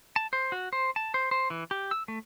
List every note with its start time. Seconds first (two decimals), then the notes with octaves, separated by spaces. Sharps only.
0.16 A5
0.33 C5
0.52 F#4
0.73 C5
0.96 A5
1.14 C5
1.31 C5
1.50 E3
1.71 G4
1.91 E6
2.08 A3